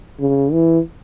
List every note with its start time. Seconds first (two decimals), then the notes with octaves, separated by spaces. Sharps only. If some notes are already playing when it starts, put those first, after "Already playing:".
0.20 C#3
0.52 E3